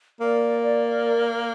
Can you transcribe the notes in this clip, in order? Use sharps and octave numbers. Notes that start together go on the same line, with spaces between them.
A#3 D5
D5
A#4